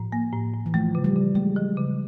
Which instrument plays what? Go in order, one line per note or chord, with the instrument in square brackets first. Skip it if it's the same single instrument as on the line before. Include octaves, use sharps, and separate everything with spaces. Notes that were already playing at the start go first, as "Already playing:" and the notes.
Already playing: [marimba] A2 [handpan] F3
[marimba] A#3
A2
A2
[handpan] E3
[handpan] F3 [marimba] A3
[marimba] C#3
[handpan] G3
[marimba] C#3
[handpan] G#3 [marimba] A3
[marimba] F3
C#3